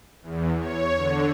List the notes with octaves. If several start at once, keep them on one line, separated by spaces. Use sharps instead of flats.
E2
C#5
D3